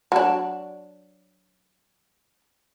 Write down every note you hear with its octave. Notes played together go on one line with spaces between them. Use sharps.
F#3 D4